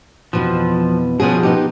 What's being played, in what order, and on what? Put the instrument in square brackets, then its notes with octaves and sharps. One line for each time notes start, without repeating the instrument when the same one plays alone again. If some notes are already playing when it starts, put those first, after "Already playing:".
[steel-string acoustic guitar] F2 B2 E3 [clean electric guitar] F3
[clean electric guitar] B2 F3 [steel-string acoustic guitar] B3 C#4 G#4
[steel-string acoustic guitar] B3 D#4 G4